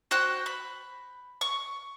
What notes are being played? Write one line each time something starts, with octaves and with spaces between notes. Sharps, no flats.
F#4 C5 G5 F#6
B5
C#6